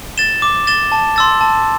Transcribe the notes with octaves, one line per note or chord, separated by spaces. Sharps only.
A6 E7 G7
D6
A6 E7 G7
A5
C6 E6 A6
A5